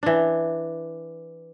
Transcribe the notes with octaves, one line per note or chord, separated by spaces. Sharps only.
E3 D4